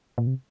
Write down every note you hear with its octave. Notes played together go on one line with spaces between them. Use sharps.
A#2
C3